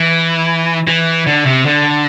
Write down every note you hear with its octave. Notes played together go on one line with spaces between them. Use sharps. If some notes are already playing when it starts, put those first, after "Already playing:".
Already playing: E3
E3
D3
C3
D3